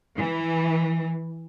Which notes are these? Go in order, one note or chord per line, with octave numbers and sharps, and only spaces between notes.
E3